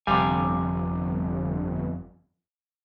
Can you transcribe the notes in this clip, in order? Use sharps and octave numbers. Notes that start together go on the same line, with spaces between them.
G1 F2 C3 G3 F5 G#5